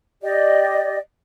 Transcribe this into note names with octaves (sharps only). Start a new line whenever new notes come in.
G4 D5 D#5